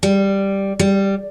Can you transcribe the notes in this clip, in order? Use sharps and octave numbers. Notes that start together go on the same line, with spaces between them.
G3
G3